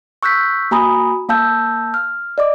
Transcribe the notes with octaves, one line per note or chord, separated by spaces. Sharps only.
C#6 E6 F#6 G6 B6
A#3 F#4 G#5 A#5 B5 D#6
A#3 F5 A5 E6 G6
F6
D5 D#5 D6